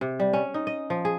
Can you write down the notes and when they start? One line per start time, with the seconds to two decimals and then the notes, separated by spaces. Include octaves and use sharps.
0.01 C3
0.20 G3
0.33 C#4
0.54 D#4
0.67 D#5
0.90 F3
1.05 G#4